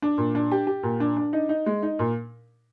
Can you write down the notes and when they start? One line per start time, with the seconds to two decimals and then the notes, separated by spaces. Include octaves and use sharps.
0.02 D4
0.18 A#2
0.35 D4
0.52 G4
0.67 G4
0.83 A#2
1.00 D4
1.17 D4
1.33 D#4
1.49 D#4
1.66 G#3
1.83 D#4
1.99 A#2